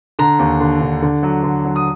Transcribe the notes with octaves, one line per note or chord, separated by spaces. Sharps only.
D3 A#5
D#2
D3
D3
D3
F#3
D3
F#3
D#6